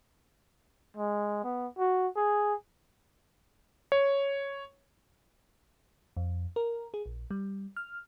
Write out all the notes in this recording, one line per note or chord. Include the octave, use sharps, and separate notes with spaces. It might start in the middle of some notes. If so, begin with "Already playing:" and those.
G#3
B3
F#4
G#4
C#5
F2
A#4
G#4
A#1
G3
F6